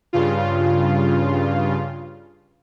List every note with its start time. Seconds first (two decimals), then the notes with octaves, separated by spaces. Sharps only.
0.13 G2 C#3 F4